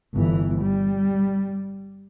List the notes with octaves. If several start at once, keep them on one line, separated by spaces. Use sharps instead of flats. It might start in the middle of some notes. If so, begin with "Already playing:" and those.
G1 E3
G3